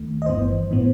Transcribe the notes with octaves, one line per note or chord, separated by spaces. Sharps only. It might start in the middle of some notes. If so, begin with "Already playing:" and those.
Already playing: D#2 D#3 A3
D#5
G1 G2 E3 B3 C5
A2 E3 B3